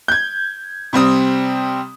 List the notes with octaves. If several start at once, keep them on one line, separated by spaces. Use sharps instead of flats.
G6 G#6
C3 G3 C4 D#6